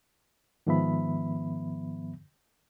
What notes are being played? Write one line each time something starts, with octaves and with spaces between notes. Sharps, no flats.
G#2 D#3 F3 B3 E5 B5